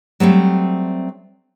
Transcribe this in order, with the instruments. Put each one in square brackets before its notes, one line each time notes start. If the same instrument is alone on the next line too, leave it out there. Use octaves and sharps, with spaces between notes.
[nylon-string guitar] F#3 G3 A3 C4